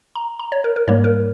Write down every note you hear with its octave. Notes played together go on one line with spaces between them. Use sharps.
A#5
A#5
C#5
A#4
A#4
G#2 G3 A#3 C#5
A#4